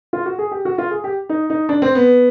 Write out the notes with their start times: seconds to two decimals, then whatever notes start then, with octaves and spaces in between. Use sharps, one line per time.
0.13 F4
0.26 F#4
0.38 G#4
0.51 G4
0.65 F#4
0.78 F4
0.91 G#4
1.04 G4
1.29 D#4
1.50 D#4
1.69 D4
1.82 C4
1.95 B3